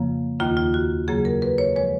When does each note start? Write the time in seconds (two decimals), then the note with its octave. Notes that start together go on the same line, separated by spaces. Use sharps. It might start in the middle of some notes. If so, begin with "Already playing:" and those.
Already playing: F2 C#3 F3 A#3
0.40 D#2 D#3 A#3 F4
0.57 F4
0.74 F#4
1.08 F2 C#3 F#3 A#3 G#4
1.25 A#4
1.42 B4
1.58 C#5
1.76 F3 G#3 C#5